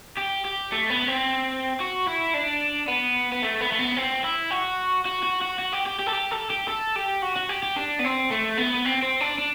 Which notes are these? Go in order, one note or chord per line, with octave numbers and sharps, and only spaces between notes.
G4
G4
A3
B3
C4
F#4
E4
D4
B3
B3
A3
B3
A3
B3
C4
E4
F#4
F#4
F#4
F#4
F#4
G4
G4
G4
A4
G4
A4
G4
A4
G4
F#4
F#4
G4
G4
D4
B3
C4
A3
B3
C4
C4
D4
D4